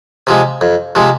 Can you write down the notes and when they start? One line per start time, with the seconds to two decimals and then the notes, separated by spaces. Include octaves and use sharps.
0.27 C3 F3 G#3
0.61 F2
0.95 C3 F3 G#3